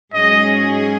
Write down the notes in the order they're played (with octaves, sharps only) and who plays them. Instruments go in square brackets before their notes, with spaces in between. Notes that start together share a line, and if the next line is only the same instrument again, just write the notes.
[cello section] G#2 F#3 C#4 G#4 [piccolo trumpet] D#5